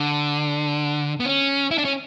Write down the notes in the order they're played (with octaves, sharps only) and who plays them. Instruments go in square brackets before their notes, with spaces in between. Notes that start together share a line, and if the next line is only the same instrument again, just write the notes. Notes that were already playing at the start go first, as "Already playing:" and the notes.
Already playing: [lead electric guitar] D3
B3
C#4
E4
D4
C#4